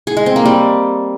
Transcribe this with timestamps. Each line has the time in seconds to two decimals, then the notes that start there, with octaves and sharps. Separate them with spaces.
0.07 G#4
0.17 G#3
0.26 C4
0.36 A#3
0.45 G3